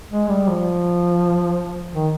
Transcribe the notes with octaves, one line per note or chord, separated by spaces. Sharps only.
G#3
G3
F3
D#3